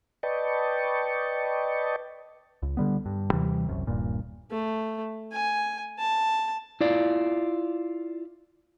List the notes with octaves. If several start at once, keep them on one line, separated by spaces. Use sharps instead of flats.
B4 D5 D#5 G5 A5 C#6
C#2
D3 G3 B3
G2
D#2 C3 E3 G3
F#1 C2 F#2
D#1 G2 A#2
A3
G#5
A5
E4 F4 D5